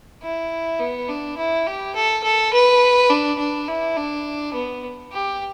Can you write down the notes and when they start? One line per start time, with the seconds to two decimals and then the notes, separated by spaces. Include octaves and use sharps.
0.23 E4
0.79 B3
1.09 D4
1.37 E4
1.67 G4
1.95 A4
2.23 A4
2.53 B4
3.10 D4
3.39 D4
3.68 E4
3.97 D4
4.54 B3
5.12 G4